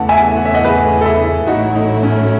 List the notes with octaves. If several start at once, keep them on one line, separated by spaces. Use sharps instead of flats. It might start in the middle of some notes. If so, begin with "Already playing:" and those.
Already playing: E2 C#3 E3 A3 F#5 A5
E5 G#5
F#5
E5
D#5 F#5
G#4 B4
A4
E4 G#4
A1 A2 F#3 A3 D#4 E4 F#4
D#4
C#4